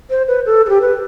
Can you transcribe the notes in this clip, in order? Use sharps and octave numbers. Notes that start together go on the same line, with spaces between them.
C5
B4
A4
A4
G4
B4